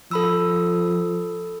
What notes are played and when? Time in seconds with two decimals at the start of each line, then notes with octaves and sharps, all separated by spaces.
0.11 F3 A4 B5 E6